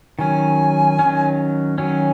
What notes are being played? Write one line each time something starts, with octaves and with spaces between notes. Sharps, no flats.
D#3 F#3 C#4 G#5
D#3 F#3 C#4
D#3 F#3 C#4 G#5